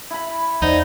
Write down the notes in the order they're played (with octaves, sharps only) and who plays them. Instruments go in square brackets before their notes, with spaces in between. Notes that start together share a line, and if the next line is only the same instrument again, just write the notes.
[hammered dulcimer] E4 B5
[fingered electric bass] E2 [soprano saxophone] D#4 [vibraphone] C5 D5 F#5